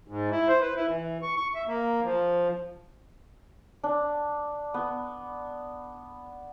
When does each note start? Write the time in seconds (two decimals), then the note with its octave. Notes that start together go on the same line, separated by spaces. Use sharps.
0.08 G#2
0.31 E4
0.48 C5
0.61 B4
0.76 E4
0.88 E3
1.22 C#6
1.36 C#6
1.55 E5
1.67 A#3
2.03 F3
3.84 D4
4.74 B3